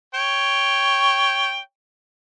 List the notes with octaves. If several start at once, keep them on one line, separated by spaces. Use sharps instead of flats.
C#5 G5